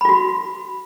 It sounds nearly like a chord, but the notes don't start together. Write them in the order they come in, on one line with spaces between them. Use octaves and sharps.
B5 F4 F#4